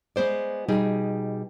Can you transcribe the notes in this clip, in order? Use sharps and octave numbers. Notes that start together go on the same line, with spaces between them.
G#3 B3 C5 D5
B2 G3 D#4 G#4